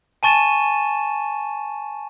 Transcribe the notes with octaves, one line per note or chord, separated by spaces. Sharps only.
G#5 A5 C#6 A6 D#7 E7